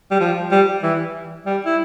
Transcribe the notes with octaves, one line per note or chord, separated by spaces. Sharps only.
G3
F3
G3
E3
G3
E4